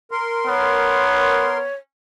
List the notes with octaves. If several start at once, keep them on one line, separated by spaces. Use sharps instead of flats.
A#4 C6
B3 C#5